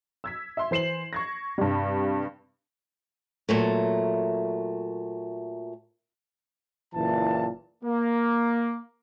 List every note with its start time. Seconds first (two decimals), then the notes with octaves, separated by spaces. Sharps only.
0.24 E6 G#6 B6
0.57 E5 C6
0.71 E3 C5 C7 E7 F#7
1.13 C#6 G#6 A#6
1.58 G2 C3 G3
3.49 A#2 F#3 A3
6.94 F#1 A#2 E3 A5
7.84 A#3